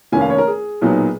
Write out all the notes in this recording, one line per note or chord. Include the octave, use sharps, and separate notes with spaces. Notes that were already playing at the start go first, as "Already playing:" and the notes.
F1 D#2 D#3 A#3 C#4 G#5
F5
C#5
A#4
G#4
B1 A#2 F#3 B3 D#4